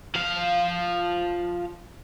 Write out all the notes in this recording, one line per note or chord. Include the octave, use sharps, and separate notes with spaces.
F3 F5